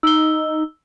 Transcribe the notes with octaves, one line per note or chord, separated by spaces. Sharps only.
D#4 E6 G7